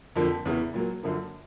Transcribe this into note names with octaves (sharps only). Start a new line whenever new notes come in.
F2 D3 F3 A#3
E2 C#3 E3
A#2 F#3 A#3
F#2 D3 F3 A#3